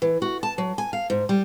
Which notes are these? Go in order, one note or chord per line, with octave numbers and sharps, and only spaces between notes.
E3
F#4
A5
F#3
G#5
F5
G#2
G3